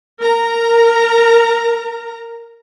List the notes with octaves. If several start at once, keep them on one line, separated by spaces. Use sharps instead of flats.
A#4 A#5